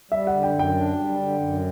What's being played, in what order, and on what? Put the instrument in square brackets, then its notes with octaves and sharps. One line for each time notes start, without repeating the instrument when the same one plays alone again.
[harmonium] G3 [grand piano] E5
[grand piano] F#5
[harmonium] D3
[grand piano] G5
[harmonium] F#2
[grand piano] G5
[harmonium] D4
G3
D3
F#2